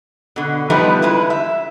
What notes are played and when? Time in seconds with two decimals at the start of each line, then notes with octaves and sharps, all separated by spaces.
0.36 B2 D3
0.70 F3 G3 A3 B3 D#4 B4
1.02 G#3 E4 B4
1.30 E5